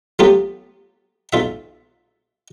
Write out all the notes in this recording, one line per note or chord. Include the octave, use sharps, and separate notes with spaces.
F#3 A3 B3 F4 G4
B1 F4 E5